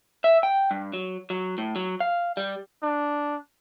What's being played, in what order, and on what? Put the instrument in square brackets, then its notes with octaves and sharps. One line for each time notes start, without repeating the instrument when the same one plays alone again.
[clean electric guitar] E5
G5
G2
F#3
F#3
A2
F#3
F5
G3
[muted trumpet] D4